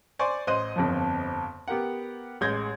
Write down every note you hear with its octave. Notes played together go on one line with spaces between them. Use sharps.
C5 D5 G#5 C#6
A1 C5 D#5 F#6 D#7
G1 F2 F3
B3 G4 A#4 F#5
A1 G#3 G6 G#6 A#6